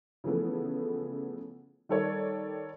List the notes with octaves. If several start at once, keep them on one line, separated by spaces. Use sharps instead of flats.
C#3 E3 F3 A3 B3
D#3 G3 A4 A#4 C#5 D5